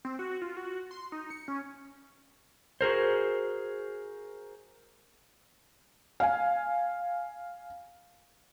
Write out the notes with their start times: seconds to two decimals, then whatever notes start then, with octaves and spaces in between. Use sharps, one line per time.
0.05 C4
0.19 F#4
0.42 F4
0.57 F#4
0.91 C6
1.12 D#4
1.30 C#7
1.48 C#4
2.81 F#4 G#4 A#4 C5
6.20 F5 G#5